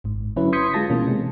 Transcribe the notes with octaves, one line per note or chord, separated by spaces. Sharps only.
G#1 G#2
D3 F#3 C#4 E4 B4
C6 D#6 G6 G#6 B6 C#7
G#3 F4 A5 A#6
B2 E3 A#3 C#4
C3 G#3